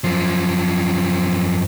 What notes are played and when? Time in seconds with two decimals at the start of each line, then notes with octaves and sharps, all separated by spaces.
0.04 F#2 F3